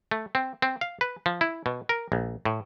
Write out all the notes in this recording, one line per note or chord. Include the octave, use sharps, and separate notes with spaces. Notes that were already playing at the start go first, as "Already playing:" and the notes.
A3
C4
C4
F5
B4
F3
E4
B2
A#4
A#1
A2